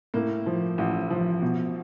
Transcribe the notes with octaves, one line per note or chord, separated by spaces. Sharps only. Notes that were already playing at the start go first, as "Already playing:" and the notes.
A2 A#3
F3
A1
F3
B2